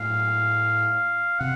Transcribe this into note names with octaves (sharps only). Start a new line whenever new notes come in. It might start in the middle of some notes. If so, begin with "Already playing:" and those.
Already playing: A2 F#3 A#3 F5
C3 F#5